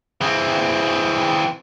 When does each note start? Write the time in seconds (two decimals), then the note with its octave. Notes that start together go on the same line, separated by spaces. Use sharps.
0.21 E3 C4 G#4